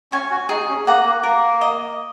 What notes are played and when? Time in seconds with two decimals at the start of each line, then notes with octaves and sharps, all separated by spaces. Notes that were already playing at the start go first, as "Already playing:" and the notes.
0.12 C#4 G#5 C#6
0.31 F#4
0.49 D#4 G#4
0.68 C#4
0.86 A#3 F#5 A#5
1.05 A#3
1.23 A#3 A#4
1.61 D#5